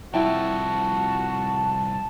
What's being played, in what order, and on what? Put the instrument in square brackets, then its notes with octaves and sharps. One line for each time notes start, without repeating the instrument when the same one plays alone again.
[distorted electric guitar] C2 F3 [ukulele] E4 G5 [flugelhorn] F#4 [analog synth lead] A5